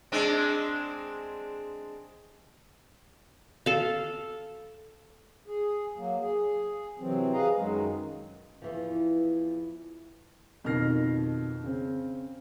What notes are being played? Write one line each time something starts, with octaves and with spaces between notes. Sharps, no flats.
G#3 C4 D4
A4 F5
G#4
F#3 A#3
G#4
C3 E3 F#3 C4
G#4 B4 D#5 F5 A#5
F#2 D#3 F#3 G#3
E2 E3 F3
F2 B2 D#3 F6 A#6 C7
C#3 C4